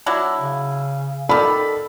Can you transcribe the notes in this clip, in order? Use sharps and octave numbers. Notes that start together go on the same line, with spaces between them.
F#3 D4 E4
C#3
D#3 A4 D5 B5